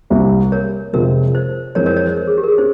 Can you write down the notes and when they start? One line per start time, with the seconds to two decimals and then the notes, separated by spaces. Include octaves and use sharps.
0.10 C2 C3 G3 A#3
0.52 A#4 C#5
0.93 F2 C3 F3 G#3 A#4
1.35 C5
1.75 F2 E3 G#3 C4 A#4 C#5
1.86 A#4 C#5
1.96 A#4 C#5
2.07 C5
2.17 A#4
2.27 G#4
2.38 G4
2.43 A#4
2.48 G#4
2.58 C#4 C5